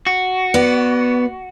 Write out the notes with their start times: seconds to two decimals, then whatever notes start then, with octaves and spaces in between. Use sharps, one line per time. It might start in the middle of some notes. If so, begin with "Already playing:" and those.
0.07 F#4
0.54 B3 D5